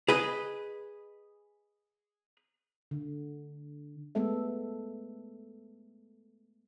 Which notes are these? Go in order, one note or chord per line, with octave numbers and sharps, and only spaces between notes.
G#4 B4 D#5
D3
G#3 A3 B3 A4 E5